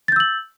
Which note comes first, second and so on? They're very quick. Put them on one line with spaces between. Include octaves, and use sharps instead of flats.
A6 G6 E6 F#7